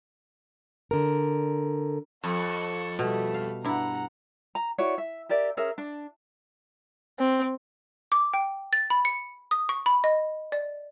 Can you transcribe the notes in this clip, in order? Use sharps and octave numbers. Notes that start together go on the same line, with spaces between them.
D3 A#4
F2 A4 C#6
B2 G3 A3 A4
F5
G2 E4 F#5 A#5
A#5
E4 F#4 C#5 D5
E5
G4 A#4 D5 E5
C#4 G#4 A#4 E5
D4
C4
D6
G5
A6
B5
C#7
D#6
C#6
B5
D#5
D5